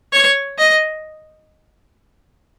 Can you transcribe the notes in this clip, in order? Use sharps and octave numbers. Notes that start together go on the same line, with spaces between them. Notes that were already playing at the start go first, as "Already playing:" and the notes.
C#5
D#5